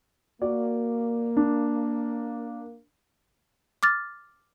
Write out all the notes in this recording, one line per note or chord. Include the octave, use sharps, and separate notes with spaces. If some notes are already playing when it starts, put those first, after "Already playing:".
A#3 F#4 D5
D4
D6 F6 A6